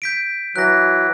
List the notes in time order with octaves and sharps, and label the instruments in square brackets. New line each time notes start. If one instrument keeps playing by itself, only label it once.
[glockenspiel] G6 B6 D7
[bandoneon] E3 F#3 [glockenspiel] F#6 A#6